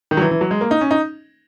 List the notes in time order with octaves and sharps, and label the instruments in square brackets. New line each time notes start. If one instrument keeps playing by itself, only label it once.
[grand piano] D#3
F#3
E3
E3
F#3
G#3
A#3
D#4
C#4
D#4